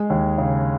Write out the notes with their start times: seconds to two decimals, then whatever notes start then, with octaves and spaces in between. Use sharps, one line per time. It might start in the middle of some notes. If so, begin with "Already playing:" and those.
Already playing: G#3
0.10 D#2
0.38 C#3